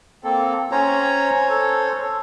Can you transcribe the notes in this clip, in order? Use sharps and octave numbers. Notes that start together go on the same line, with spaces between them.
A#3 C4 A4
C#4 C5 C#5 A#5
A4